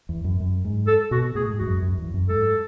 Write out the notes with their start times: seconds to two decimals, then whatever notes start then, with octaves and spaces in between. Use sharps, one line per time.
0.09 E2
0.24 F#2
0.40 F#2
0.65 G#2
0.87 A4
1.11 B2 F#4
1.35 A2 G#4
1.50 G#2
1.59 E2 F#4
1.67 F#2
1.82 F#2
1.98 E2
2.14 F#2
2.29 G#2 A4